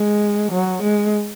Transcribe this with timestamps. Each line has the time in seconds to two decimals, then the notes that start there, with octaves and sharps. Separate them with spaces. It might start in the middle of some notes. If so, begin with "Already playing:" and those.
Already playing: G#3
0.52 F#3
0.83 G#3